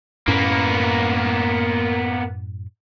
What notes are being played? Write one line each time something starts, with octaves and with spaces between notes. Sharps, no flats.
F#2 A2 A#3 B3 C#4